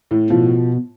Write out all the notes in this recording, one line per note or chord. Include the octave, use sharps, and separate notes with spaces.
A2
B2 F3